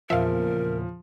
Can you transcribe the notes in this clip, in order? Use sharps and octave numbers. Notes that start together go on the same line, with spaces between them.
E2 A#2 C#3 F3 A#4 E5 F5